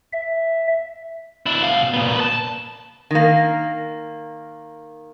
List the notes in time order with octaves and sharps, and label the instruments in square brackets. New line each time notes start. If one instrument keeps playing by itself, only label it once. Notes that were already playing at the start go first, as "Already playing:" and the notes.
[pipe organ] E5
[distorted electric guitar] D4 E4
B2 F5
A#2 B3
B4 A5
[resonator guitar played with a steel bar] D#3 A#3